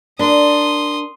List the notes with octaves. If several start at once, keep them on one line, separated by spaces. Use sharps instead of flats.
D4 A#4 C6 D#6